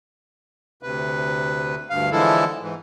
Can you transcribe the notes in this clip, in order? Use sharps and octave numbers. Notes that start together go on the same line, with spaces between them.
D2 C3 B4
D2 G2 F5
D3 E3 F3 G#3 E4 A4
G#2 E3